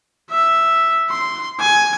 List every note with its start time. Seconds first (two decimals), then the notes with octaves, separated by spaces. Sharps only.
0.30 E5
1.10 C6
1.60 G#5